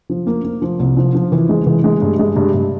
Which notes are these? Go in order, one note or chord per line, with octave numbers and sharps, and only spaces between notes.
F3
A#3
A#3
F3
C2
F3
F3
E3
G#3
E3
G#3
G2
G#3
G2
G2